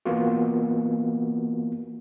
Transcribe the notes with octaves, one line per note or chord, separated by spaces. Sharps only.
E3 A#3 B3 F4 F#4